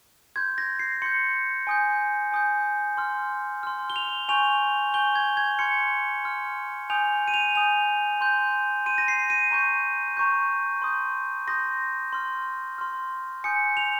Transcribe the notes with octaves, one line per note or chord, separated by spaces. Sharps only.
C6 G6 G#6
A#6
C7
C6 G6 C#7
G#5 D#6 G6
G#5 D#6 G6
C6 F6
C6 F6
G7
F7
G#5 C#6 G6 F7
G#5 C#6 G6 G7
G#6
G#6
C6 F6 C#7
C6 F6
G#5 D#6 G6 F7
D#7
F7
G#5 D#6 G6 F7
C6 G6
C6 G6 D#7
A#6
C7
D#7
A#5 C#6 G6
A#5 C#6 G6
C6 D#6 G6
C6 D#6 G6 A#6
C6 F6
C6 F6
G#5 D#6 G6 C#7
F7